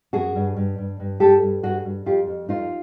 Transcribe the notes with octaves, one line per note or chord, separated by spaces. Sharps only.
F#2 F#4 G#4
G2
G2
G2
G2
G2 G4 A4
G2
G2 F#4 G#4
G2
F2 F4 G4
F2
F2 D#4 F4